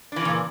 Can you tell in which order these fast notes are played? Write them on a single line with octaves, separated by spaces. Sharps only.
D4 E3 C#3 A#2